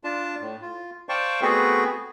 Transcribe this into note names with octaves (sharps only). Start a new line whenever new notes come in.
D4 F4 A5
A2
F4
C5 D5 F5 G5 A5 C#6
A3 B3 C4 F#4 G#4 B4